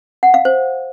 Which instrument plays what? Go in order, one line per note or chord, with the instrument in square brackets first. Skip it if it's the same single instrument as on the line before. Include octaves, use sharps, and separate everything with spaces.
[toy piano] F#5
F5
C5